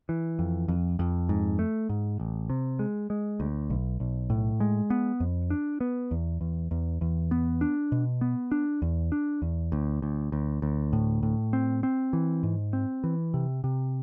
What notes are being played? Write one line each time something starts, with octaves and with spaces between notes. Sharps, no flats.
E3
F2
F2
F2
G#2
A3
G#2
A1
C3
G#3
G#3
D2
B1
B1
A2
G#3
B3
F2
D4
B3
E2
E2
E2
E2
B3
D4
B2
B3
D4
E2
D4
E2
D2
D2
D2
D2
A2
A2
C4
C4
E3
G#2
C4
E3
C3
C3